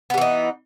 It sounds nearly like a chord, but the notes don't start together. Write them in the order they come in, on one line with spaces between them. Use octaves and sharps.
B3 G3 E3 D#4